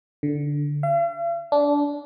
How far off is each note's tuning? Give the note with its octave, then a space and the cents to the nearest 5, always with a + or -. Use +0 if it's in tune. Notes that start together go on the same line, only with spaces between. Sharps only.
D3 -5
F5 -45
D4 -20